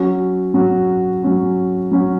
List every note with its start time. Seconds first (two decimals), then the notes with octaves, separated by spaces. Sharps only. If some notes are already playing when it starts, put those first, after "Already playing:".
Already playing: F#3 C#4 F#4
0.54 F#3 C#4 F#4
1.23 F#3 C#4 F#4
1.91 F#3 C#4 F#4